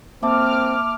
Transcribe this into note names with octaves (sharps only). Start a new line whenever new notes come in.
A#3 C4 E5 A5 D6 F6